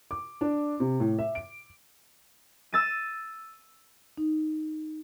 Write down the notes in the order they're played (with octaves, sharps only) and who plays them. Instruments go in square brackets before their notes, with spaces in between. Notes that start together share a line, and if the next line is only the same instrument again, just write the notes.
[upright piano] D6
D4
C3
A2
E5
D7
[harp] E6 A6 D#7
[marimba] D#4